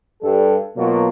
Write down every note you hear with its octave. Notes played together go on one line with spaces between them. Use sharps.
G2 G3 A4
B2 F#3 A#3 F4